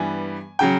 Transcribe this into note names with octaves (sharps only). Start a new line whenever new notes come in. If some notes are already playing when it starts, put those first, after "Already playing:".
Already playing: G2 E3 G3 B3 G#5
C#3 F#3 G5